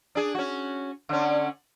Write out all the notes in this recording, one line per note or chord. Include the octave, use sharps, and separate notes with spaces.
D4 G#4
C#4 F#4
D3 C#4